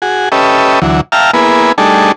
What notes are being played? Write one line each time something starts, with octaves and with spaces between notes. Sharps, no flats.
F#4 G#4
C#4 G4 A4 B4 D#5 E5
D2 E3 F#3
E5 F5 G5 A5 A#5 F6
A#3 B3 E4 G#4 B4
G3 A3 D4 D#4 G#4 A4